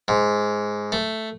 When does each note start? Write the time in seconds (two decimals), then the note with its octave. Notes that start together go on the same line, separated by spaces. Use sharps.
0.08 G#2
0.92 A3